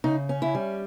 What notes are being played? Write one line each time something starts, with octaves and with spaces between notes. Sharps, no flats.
C#3 D#4
C#4
E4
G3